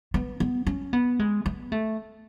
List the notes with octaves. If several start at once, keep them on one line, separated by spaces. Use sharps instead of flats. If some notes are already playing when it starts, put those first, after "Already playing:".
B3
B3
C#4
B3
G#3
B3
A3